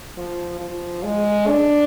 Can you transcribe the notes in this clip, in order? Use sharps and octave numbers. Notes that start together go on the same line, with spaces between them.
F3
F3
G#3
D4